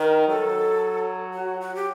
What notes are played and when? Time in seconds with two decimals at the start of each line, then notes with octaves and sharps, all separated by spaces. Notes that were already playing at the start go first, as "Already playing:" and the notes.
Already playing: D#3 A#4
0.29 F#3 A4
1.33 F#4
1.61 F#4
1.75 G4